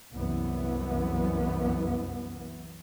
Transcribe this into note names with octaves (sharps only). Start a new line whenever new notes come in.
C2 F#2 E3 B3